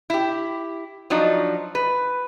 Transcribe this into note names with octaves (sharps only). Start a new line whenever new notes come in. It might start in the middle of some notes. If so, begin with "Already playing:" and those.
E4 G4
F3 F#3 D4 D#4
B4